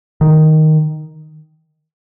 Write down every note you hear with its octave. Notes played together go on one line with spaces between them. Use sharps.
D#3